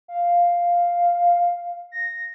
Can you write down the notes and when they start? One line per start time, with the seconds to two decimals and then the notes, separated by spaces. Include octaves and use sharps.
0.08 F5
1.92 A#6